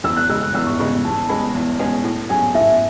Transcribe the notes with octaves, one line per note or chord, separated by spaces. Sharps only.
E2 E6
F#6
C#3 G#3 E6
F#6
E2 E6
C#6
C#3 G#3 C#6
E2 A5
B2 G#3 C#4 G#4 B5
E2
B2 G#3 C#4 G#4
A2
F#3 C#4 G#4 G#5
A2 E5